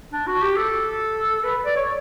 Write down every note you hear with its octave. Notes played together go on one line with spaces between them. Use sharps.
D4
F#4
G4
A4
B4
D5
C#5